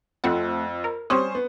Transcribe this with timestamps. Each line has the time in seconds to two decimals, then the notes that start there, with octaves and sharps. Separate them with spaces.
0.24 F2 A3 C4 F#5
0.84 A#4
1.10 G3 C4 C#4 C5 C#6 D#6
1.35 B3